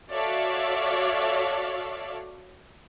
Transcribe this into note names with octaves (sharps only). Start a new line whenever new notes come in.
F#4 A4 C#5 D5 E5 F5